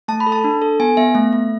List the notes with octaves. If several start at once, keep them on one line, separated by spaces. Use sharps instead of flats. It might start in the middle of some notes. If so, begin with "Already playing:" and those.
A3 A5
B5
A4
A5
D4
A4
B3 G#5
B3 E5
A3
A3